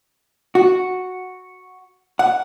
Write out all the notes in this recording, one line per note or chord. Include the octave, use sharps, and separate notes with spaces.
F#4
F#5